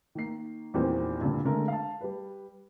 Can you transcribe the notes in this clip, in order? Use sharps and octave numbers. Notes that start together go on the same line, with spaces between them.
D#3 A#3 C7
E2 A#2 D#3 E3 G3 C4
G2 A#2 D3
D3 G#3 A3 A#4
F5 A5
G3 B4